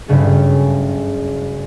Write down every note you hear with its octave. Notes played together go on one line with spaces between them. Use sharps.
F#1 G2 C#3 A3 G#4